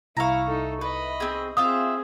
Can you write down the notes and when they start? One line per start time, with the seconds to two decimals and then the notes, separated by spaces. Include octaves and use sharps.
0.17 C2 E4 E5 F5 A#5 C#6
0.47 D#4 A4
0.81 B4 D#5 B5
1.20 C4 G#4
1.57 C4 F4 G#4 E5 F5 D#6